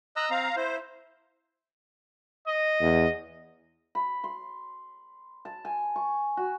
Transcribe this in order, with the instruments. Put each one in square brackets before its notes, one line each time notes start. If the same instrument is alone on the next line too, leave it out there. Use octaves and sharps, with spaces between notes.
[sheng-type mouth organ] D#5 A#5 E6 [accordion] F#6
[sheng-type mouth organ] C4 [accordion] F5 A#5
[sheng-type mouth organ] E4 [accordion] C5
[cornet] D#5
[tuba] E2
[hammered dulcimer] B5
C6
A5
G#5
C#6
F#4